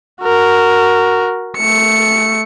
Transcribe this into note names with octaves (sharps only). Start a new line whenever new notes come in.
F#4 A#4
A3 C#7